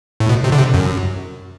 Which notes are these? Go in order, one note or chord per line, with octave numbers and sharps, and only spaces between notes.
A2
B2
C3
D3
C3
F#2